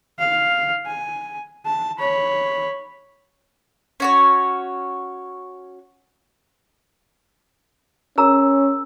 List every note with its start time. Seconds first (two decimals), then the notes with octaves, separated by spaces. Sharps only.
0.19 F5
0.86 G#5
1.66 A5
1.99 C#5 B5
4.00 C#4 F#4 C#5
8.18 C#4 G#4 A#4 A#5 E6